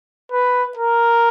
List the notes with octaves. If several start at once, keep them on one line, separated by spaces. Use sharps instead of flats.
B4
A#4